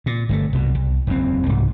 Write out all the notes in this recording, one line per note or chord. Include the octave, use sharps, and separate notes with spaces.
A#2
G1 C3 A3
C2 B2
C2
F#1 E2 C4
C2 G#2